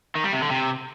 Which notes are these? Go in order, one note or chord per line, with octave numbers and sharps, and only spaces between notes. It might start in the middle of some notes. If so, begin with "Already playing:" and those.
D#3
G3
C3
D3
C3